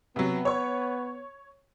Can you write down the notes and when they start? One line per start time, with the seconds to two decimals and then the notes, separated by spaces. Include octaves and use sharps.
0.16 C3 F#3 B3
0.45 C#5 C#6